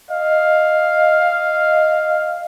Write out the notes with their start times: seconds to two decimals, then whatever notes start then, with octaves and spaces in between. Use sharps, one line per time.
0.11 D#5 F5